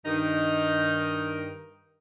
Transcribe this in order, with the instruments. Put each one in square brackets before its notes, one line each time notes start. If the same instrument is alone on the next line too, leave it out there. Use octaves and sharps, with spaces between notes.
[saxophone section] G2 D#3 D#4